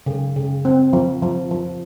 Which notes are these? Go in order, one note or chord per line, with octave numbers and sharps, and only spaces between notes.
C#3
C#3
C4
F3
F3
F3